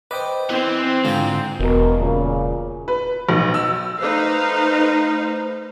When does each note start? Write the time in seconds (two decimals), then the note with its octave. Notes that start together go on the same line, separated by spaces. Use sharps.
0.11 B4 C5 D5 D#5 G5
0.50 E3 C4
1.05 G#2 D3 F4 C6
1.60 E1 B2 A#4
1.98 A#2 C#3
2.88 B4
3.29 B1
3.54 E6
3.97 A3 D#4 B4 C5 F5